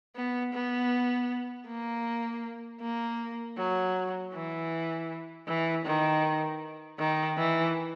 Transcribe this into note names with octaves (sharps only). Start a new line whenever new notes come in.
B3
B3
A#3
A#3
F#3
E3
E3
D#3
D#3
E3